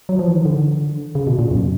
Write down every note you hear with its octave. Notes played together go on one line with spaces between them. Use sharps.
F#3
F3
E3
D#3
D3
C#3
B2
A#2
F#2